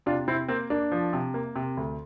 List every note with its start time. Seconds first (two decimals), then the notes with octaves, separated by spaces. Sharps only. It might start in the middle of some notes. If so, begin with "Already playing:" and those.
0.06 C3 D4 F4
0.28 C3 C4 E4
0.48 A#3 C4
0.70 A#3 D4
0.92 F3
1.13 C3
1.34 A#3
1.56 C3
1.77 D2